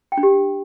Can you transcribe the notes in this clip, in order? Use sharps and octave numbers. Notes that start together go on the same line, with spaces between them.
G5
D4
G4